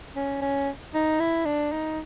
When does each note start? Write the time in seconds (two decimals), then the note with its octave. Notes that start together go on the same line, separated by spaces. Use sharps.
0.16 C#4
0.42 C#4
0.94 D#4
1.20 E4
1.46 D4
1.72 D#4